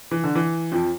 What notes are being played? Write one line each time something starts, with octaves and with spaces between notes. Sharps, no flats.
E3
D3
E3
F2 F3